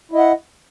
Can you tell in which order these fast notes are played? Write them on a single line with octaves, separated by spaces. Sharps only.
E4 D#5 F#5